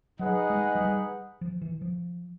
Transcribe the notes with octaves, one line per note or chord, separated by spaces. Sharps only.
F#3 D#4 G#4 B4 D#5 F#5
G#3
F#3
G3
F3
E3
F3